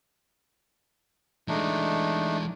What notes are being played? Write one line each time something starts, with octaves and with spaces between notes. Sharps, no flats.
E3 G#3 A3 D4 D#4